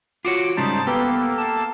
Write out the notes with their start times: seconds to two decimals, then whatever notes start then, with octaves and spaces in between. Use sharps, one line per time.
0.25 F4 F#4 C#5 D6
0.57 G#2 C#3 G3 D#4 C5 A5
0.87 A#3 B3 G4 A4
1.38 A5